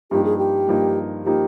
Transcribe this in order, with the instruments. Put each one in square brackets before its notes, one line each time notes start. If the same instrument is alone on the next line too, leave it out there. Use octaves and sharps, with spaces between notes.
[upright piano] G2 F3 A#3 D#4 [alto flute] G4
[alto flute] G#4
G4
[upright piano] G2 F3 A#3 D#4
[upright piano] F3 A#3 D#4 [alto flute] G4